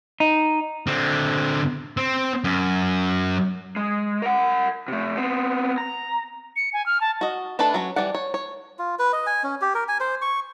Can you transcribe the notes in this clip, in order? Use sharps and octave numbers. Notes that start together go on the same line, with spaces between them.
D#4
D3 C4
C4
F#2
G#3
A#4 F#5
C3 A3
B3 C4
A#5
C#7
G#5
F6
A5
F#4 D#5
A3 D4 A4 B4 A5
F#3 C#4
E3 G3 D5 F#5
C#5
C#5
F4
B4
D#5
G#5
C#4
G4
A#4
G#5
C5
C#6